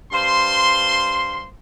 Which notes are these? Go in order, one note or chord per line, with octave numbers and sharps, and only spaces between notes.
G2 C5 F5 C6